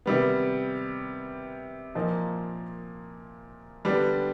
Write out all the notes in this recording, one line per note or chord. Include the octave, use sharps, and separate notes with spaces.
C3 D#3 G3 B3
A#2 F3 A#3 D#4
D3 G3 B3 D4